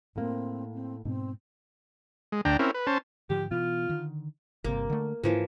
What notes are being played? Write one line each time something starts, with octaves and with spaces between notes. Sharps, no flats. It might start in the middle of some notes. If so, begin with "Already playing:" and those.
A2 A#3 C4
C4
G#2 B2 C4
G#3
D2 D4 G5 A#5
C4 C#4 E4 A#4
B4
C#4 C5 A5
G#2 D3 F3 G4
B2 E3 B3 F4
D3 D#3
G1 C3 A#3
D3 A3
G#2 E3 F3 A#3